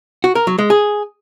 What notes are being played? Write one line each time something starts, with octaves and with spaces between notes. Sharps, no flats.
F#4
A#4
F#3
G#3
G#4